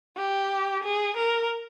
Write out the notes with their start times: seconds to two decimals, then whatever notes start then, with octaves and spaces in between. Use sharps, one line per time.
0.18 G4
0.84 G#4
1.17 A#4